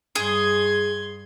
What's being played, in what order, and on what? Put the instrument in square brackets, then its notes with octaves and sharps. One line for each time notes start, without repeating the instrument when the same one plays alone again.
[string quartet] G2 C6 G#6 [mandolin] G#4